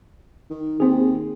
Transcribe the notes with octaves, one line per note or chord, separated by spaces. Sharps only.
D#3
D#2 C4 G#4